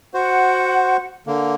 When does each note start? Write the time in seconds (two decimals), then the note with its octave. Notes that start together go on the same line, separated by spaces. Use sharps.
0.14 F#4 C5 F#5
1.27 D3 A#3